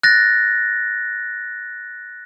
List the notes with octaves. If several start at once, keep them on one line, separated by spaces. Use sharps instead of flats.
F#6 A6 A#6